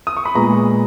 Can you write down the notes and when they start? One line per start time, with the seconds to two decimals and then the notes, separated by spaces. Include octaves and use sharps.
0.07 D#6
0.17 C#6
0.25 B5
0.35 A#2 G#3 B3 A#5